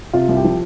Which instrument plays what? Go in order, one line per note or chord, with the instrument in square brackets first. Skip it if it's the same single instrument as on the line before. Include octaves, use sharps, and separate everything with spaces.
[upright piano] C3 F4
C2
G4
F3